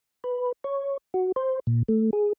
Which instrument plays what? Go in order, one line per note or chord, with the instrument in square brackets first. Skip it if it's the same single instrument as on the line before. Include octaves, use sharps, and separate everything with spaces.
[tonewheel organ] B4
C#5
F#4
C5
A#2
A3
G#4